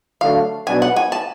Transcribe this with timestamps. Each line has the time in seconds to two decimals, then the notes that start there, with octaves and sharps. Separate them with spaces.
0.21 D3 F#3 A3 D4 F5
0.67 B2 F#3 B3 D4 G#5
0.82 F#5
0.96 G#5
1.12 A5